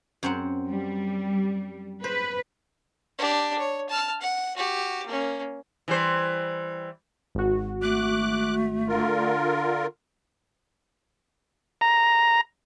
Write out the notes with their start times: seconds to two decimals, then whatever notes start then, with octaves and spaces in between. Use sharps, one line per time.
0.23 F#2 C4 F#5
0.68 G3
2.04 B4 C5
3.19 D4 G4
3.59 C#5
3.89 A5 F6
4.21 F#5
4.56 F#4 G4
5.06 A#3 C#4
5.88 E3 G3 C5
7.35 G#1 F#4
7.82 A3 D6 F#6
8.88 D3 F4 A#4
11.81 A#5